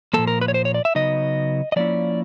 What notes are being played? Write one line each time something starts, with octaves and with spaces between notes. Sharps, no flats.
A#2 F3 A#3 A4
A#4
B4
C#5
C5
C#5
D5
E5
C#3 F#3 B3 D#4 D#5
D#5
F3 A#3 C#4 E4 D5